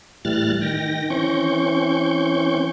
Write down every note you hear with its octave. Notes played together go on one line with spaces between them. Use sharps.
A2 E3 G3 F6 F#6 A6
D#3 G5 A#6
E3 C4 C#4 C#6 G6